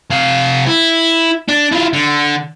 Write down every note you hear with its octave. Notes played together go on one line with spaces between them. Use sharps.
C3 F5
E4
D4
E4 F4
D3